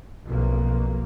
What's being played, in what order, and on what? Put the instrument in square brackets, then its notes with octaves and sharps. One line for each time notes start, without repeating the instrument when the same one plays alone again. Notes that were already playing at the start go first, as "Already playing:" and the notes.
[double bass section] B1 F2 A#3